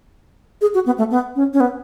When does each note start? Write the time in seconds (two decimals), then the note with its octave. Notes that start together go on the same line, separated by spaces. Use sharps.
0.61 G#4
0.74 F#4
0.86 B3
0.98 A3
1.11 B3
1.36 C#4
1.53 C#4
1.60 B3